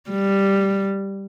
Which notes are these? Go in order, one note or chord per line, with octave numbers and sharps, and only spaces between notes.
G3